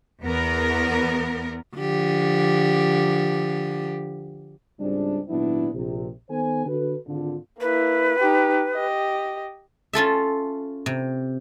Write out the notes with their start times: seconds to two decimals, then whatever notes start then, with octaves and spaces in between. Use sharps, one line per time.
0.22 E2 B3 A#4
1.76 D3 F3 G4
4.79 C#2 G#2 G3 G#3 C4 D4
5.28 G#1 A#2 F#3 B3 D4 E4
5.73 A#1 C3
6.30 D#3 B3 A4 C5 G#5
6.65 D3 F#4 A4 B4
7.06 G#1 D3 F4
7.60 A#3 E4 B4
8.19 D#4 G4
8.74 G4 D#5
9.93 C#4 F4 A4 E5
10.86 C3